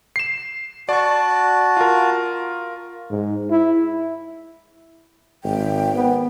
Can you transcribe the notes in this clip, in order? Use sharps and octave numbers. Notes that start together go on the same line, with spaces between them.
C7 E7
F#4 D5 A5 C#6
F4 A#4
G#2
E4
G#1 G5
B3